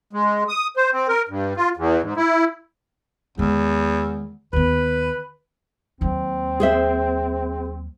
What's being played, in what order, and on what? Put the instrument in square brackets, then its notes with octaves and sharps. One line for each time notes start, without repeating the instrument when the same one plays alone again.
[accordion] G#3
D#6
C5
C4
A#4
G2
F4
E2
G#2
E4
[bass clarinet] E2 [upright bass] D#3 G#3
[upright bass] D#2 B3 [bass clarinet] B4
[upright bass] D#2 F#3 [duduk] C4
[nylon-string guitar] G#4 C5 E5